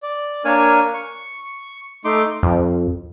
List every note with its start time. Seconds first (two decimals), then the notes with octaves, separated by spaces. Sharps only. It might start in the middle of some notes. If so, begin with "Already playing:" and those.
0.03 D5
0.45 A#3 D4 A#4 C#5 G#5
0.94 C#6
2.05 A3 D#4 C6 D6
2.43 F2